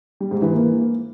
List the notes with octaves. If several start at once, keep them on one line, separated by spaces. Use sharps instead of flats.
G3
G#2
E3
A#3